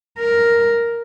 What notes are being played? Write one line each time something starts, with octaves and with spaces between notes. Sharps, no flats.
A#4